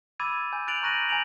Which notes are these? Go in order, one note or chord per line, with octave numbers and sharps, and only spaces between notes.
B5 D6 E6 G#6 A6 D#7
G#5 G6
F#6 G6 A6 D7 F7 F#7
A#5 C#6 F#6 A#6 D#7 F#7
G#5 A#5 G6 D7 F7 F#7